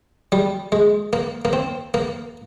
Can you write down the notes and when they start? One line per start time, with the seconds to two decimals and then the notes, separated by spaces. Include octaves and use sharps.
0.32 G3
0.72 G#3
1.13 A#3
1.45 A#3
1.53 C4
1.94 A#3